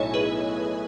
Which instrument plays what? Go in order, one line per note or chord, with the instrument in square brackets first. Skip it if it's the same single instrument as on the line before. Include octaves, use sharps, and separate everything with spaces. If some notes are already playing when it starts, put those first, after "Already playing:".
Already playing: [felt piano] B1 A2 [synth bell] A4 C#5 D#5 E5 G#5
[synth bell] G#4 B4